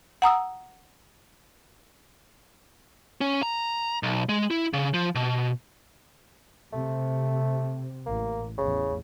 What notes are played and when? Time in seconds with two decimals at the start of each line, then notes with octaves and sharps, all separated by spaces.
0.22 F#5 A#5 D#6 E6
3.21 C#4
3.43 A#5
4.03 B1
4.29 G#3
4.51 E4
4.73 C#3
4.94 F3
5.15 B2
6.73 C3 A3
8.06 A1 A#3
8.58 A1 E2 C#3